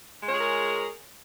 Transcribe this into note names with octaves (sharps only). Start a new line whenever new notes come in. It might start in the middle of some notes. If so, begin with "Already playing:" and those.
G#3 F4 G#4 A#4 C#5